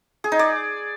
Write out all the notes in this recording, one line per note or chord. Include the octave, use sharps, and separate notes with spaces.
G#4
D#4
D5